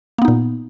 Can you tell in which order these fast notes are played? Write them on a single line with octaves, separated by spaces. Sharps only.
A#3 B3 D#4 A#2